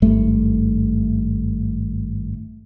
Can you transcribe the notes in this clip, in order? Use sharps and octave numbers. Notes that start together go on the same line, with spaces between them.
G#1 G2 A3